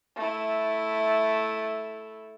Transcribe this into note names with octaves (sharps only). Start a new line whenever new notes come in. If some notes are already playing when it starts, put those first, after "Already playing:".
A3 E4